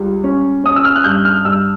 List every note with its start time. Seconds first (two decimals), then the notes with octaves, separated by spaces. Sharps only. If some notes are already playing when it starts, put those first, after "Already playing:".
Already playing: C#2 G3
0.24 C#4
0.64 C#4 D#6
0.76 E6
0.85 F6
0.96 F#6
1.04 G2 G6
1.25 F6
1.45 G2 E6